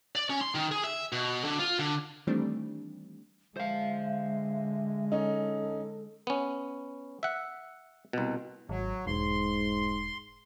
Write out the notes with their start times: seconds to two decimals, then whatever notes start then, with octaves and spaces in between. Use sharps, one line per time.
0.15 D5
0.30 C#4
0.41 C6
0.55 D#3
0.71 G#4
0.84 E5
1.12 B2
1.44 D3
1.60 F4
1.79 D3
2.27 D#3 E3 G3 A3 C4 D4
3.57 D3 G#3 C5 E5 F5
5.12 C#4 D#4 A4
6.27 B3 C#4
7.23 E5 F#5
8.13 C2 B2
8.69 G#1 F#3
9.07 E1 G#2 C6